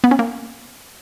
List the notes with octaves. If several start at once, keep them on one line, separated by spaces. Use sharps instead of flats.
B3
C#4
A#3